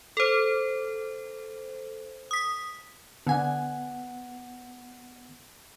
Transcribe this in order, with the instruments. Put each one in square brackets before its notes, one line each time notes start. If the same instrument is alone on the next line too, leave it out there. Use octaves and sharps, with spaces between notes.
[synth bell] A4 C5
D#6 B6
[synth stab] D3 G#5 [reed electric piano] B3 F#5